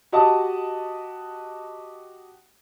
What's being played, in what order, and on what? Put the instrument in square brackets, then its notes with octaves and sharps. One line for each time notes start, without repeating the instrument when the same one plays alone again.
[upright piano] F#4 G4 D#5 F#5 A5 D#6